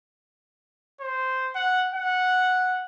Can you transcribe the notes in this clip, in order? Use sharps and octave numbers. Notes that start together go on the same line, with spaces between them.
C5
F#5
F#5